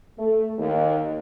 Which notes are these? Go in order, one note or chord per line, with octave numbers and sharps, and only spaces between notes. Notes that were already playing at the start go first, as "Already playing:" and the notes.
A3
D#2